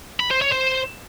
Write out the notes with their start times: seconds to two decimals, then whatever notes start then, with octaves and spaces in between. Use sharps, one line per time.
0.20 B5
0.31 C5
0.41 C#5
0.52 C5